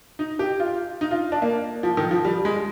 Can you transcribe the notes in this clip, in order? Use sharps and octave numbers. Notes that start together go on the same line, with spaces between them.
D#4
G4
F4
D#4
F4
D4
A#3
F3
D#3
F3
G3
G#3